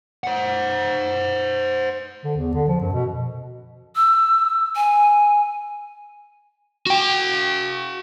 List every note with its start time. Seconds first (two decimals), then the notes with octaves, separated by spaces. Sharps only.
0.24 C5 F#5
2.23 D3
2.37 E2
2.54 D3
2.68 F3
2.81 F#2
2.92 B2
3.96 E6
4.76 G#5
6.87 F#4 G5